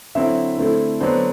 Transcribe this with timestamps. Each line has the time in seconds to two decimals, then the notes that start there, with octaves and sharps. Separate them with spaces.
0.15 D3 F#3 C4 E4 E5
0.58 D3 A3 C4 E4
1.01 D3 F#3 B3 D4 C5